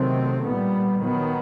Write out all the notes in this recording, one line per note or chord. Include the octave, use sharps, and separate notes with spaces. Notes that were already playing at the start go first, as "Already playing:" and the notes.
Already playing: C3 D#3 F#3 A3 C4
A#2 G3 B3
D#3 F#3 B3